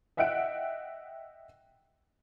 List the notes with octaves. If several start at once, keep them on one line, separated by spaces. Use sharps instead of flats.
D#5 E5 F#5 G5 F#6 D7